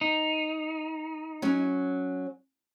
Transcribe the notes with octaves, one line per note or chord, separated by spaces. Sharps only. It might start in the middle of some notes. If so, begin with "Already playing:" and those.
D#4
F#3 C#4